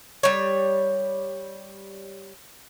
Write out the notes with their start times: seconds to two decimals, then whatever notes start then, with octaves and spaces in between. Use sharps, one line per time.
0.23 G3 C#5